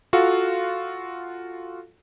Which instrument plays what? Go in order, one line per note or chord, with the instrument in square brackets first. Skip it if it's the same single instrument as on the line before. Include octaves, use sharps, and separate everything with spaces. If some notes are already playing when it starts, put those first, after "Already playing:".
[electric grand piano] F4 F#4 A4 F5